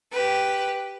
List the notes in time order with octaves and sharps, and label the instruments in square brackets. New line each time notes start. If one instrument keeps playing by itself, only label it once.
[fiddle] G4 B4